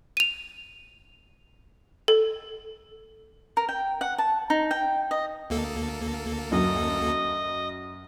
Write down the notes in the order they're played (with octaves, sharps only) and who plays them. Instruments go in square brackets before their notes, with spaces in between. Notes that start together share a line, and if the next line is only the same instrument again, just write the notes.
[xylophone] D#7 F7
A4
[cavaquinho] A#4
G5
F#5
A5
D#4
G5
D#5
[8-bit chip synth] D2 A#3 A4
[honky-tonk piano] F#2 [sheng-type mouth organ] D#5